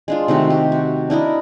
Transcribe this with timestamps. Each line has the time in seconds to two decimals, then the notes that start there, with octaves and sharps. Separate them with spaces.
0.08 G#3 D4 F4
0.28 C3 D#3 A3 F#4
0.50 G4
0.72 F#4
1.10 D4 E4 A#4 D#5